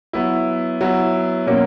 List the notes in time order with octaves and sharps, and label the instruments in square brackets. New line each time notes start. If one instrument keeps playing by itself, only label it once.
[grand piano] F#3 B3 E4
F#3 B3 E4
B2 F#3 A#3 C#4